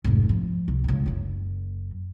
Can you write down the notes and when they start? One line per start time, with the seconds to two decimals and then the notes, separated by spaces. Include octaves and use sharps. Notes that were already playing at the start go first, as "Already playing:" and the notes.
0.04 F1 G#2
0.29 F3
0.68 C2
0.84 C#2 G2
1.06 F#1 F#2